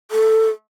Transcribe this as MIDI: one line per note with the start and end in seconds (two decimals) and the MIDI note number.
0.11 0.48 69